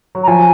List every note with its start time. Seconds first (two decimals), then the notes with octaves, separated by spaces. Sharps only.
0.15 F#3
0.23 A#5
0.27 F3 G#5